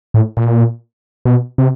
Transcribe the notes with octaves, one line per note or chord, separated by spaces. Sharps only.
A2
A#2
B2
C3